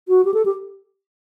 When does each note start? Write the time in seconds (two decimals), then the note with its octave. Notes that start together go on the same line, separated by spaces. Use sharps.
0.08 F#4
0.25 G4
0.34 A4
0.45 G4